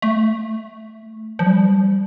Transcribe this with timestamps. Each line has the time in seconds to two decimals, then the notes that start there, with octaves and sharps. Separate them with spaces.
0.02 A3
1.39 F3
1.47 G3